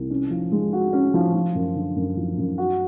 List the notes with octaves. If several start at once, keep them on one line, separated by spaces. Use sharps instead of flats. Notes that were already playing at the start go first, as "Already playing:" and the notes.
Already playing: C2
C#4
F3
G#3
F#4
C#4
F3
F3
F#2
D3
F#2
F3
F#2
F#4